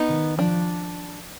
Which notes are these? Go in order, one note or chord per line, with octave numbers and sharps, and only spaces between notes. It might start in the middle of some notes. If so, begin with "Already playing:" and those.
Already playing: B3 D#4
D#3
F3 D4